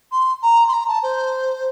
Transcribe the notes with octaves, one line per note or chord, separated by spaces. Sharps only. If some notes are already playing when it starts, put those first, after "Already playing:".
C6
A#5
C6
A#5
A5
C5